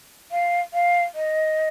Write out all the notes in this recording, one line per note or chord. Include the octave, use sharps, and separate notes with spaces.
F5
F5
D#5